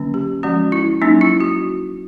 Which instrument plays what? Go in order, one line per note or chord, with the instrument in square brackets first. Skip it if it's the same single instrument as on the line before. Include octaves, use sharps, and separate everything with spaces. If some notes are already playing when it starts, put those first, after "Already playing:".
Already playing: [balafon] D3 F#3 A#3 C#4
G4
F3 G#3 C#4 F#4
E4
F#3 A#3 C#4 D#4
E4
F#4